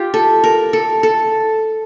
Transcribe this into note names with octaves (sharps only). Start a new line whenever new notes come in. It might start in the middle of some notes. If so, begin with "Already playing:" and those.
Already playing: F4 G4
A4
A#4
A4
A4